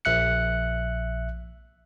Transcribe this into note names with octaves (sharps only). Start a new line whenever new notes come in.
A#1 E5 F#6 C#7